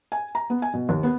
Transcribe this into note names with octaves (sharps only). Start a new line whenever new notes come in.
G#5
A#5
B3
G#5
B2
D#2
B3